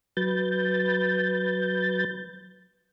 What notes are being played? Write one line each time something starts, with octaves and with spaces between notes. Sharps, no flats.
F#3 B4 G6 A6